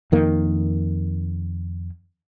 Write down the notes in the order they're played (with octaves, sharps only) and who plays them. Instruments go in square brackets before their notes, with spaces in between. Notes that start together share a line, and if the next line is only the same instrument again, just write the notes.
[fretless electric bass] F2 D#3 A#3